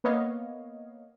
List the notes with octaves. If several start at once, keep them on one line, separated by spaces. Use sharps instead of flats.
A#3 B3 C#5 D#5 F5